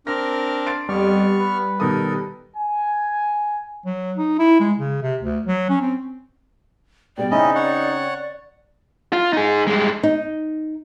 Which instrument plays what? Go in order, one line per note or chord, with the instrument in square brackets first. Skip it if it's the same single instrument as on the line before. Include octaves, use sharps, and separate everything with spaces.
[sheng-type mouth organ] C4 A#4 F6 [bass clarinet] D4 [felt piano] A#6
[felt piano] C6 A6 D7
[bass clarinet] F2 [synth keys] G3 [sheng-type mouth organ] B3 C#6 F6
[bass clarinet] B4
[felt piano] B2 D#3 D#6 [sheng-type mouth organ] A4 A#4
[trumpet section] G#5
[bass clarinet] F#3
D#4
E4
G#3
C#3
C3
D2
F#3
C#4
C4
[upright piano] B2 G3 [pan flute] D5 [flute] G5
[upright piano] C#3 C4 G5 [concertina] C#4 E4 D#5 [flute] D#4
[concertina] C#5 F#5
[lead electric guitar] F4
D#4 G#4
G2 G#3
[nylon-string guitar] D#4